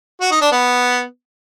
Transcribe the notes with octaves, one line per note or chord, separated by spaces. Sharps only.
F#4
D#4
D4
B3